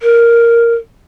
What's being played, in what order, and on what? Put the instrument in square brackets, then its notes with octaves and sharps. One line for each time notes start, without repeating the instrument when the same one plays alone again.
[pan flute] A#4